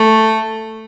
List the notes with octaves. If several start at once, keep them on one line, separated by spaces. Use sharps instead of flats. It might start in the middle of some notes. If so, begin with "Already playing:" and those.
Already playing: A3